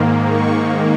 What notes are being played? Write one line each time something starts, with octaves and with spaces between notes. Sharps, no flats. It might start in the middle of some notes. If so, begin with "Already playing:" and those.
Already playing: G#2 D#3 A#3
C#6